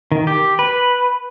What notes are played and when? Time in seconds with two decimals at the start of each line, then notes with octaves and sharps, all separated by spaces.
0.12 D#3
0.27 G4
0.59 B4